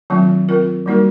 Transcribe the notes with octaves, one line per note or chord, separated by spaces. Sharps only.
D#3 F#3 A3 C4 F4
C4 F4 A#4
G3 A#3 D#4 F#4 A#4